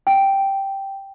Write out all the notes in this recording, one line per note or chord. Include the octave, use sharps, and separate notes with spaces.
G5